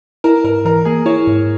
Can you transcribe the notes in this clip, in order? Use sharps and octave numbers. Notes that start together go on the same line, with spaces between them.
E4 A#4
G#2 A#4
E3 A#4
A#3 G#4
E4 C#5
G#2